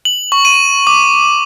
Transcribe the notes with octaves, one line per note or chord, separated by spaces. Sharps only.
F#7
C#6
D#7
D6